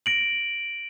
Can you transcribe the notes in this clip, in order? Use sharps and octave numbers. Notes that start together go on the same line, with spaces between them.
A#6 D7 F#7